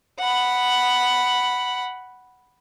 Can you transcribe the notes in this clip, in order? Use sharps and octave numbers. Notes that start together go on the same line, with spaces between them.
F#5 B5